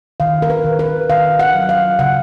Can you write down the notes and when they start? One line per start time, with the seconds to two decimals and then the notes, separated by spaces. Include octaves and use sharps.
0.20 D#3 F5
0.42 A#4
0.50 B4
0.64 D#3
0.79 B4
1.10 D#3 F5
1.39 F#5
1.54 F#3
1.69 F5
1.99 C#3 F#5